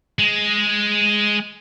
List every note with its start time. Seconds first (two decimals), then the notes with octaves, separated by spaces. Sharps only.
0.19 G#3